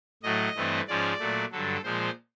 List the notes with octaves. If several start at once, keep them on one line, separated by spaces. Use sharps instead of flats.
A2 F#3 A3 D#5
G2 E3 A3 C4
G#2 F3 G#3 C#4 D5
A#2 F#3 A3
G2 D3 F#3 A4
A#2 F3 G#3 C5